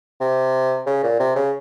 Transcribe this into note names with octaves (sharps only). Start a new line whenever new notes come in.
C3
C#3
A#2
C3
C#3